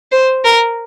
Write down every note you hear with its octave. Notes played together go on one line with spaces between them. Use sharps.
C5
A#4